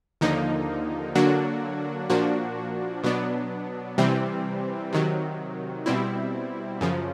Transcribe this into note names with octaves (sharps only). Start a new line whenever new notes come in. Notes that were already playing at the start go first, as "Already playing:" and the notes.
D#2 D3 F3 A#3 D#4
D3 F#3 A#3 D4 F#4
A#2 F3 A#3 D4 F#4
B2 F#3 B3 D4
C3 E3 G3 C4
C3 D#3 F#3
B2 G3 C4 E4
F#2 C#3 F3